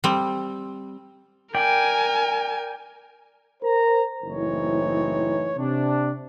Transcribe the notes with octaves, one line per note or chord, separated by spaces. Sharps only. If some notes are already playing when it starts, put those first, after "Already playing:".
G3 C4
A#4 D5 G5 G#5
A#4 C5 A#5
F#1 A2 E3 C4 D#4 C#5
C3 D4